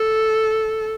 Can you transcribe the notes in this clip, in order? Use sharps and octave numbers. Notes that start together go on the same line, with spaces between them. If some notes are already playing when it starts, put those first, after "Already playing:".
Already playing: A4